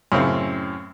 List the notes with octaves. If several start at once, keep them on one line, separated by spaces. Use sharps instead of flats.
F#2 A2 C#3 C4